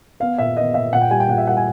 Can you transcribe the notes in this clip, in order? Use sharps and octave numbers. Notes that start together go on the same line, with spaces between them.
B3 F5
A#2 E5
B3 D#5
A#2 E5
A#2 F#5
G5
G3 G#5
G5
A#2 F#5
E5
G3 F#5
G#5